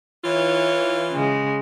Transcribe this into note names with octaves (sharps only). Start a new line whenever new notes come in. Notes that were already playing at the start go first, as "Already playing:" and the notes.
E3 F4 C#5
C#3 G#3